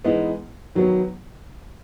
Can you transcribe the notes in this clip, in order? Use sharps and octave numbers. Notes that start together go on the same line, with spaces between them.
E3 G#3 B3 D#4
D#3 F#3 B3